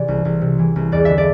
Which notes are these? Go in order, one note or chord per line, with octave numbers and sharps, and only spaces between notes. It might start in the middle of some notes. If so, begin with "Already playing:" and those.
Already playing: C3 E3 D5
C2
C2
C3
E3
C2
E2 D5
D3 E5
D5